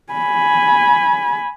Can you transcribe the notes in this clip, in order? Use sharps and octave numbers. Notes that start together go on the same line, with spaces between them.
G#5 B5